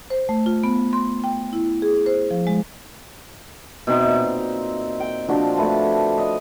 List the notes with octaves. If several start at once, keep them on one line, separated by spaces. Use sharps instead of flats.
C5
A3
F4
B3
C6
G5
E4
G#4
C5
F3
G#3
B2 C4 D#4 E5
A#2
G5
A#2 F3 D4 F#4
A3 B4 A5
D#5